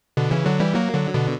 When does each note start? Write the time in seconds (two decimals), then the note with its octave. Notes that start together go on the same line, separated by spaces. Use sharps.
0.17 B2 D3
0.31 C#3 E3
0.46 D3 F#3
0.60 E3 G3
0.75 F#3 A#3
0.94 D3 F#3
1.14 B2 D3